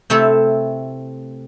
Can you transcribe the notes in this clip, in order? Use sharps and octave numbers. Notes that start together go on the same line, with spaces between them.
C3 A3 C4 E4 A4